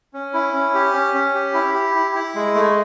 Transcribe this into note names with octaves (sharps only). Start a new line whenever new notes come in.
C#4
E4
C#4
G4
C#4
C#4
G4
E4
G4
E4
E4
G#3
A3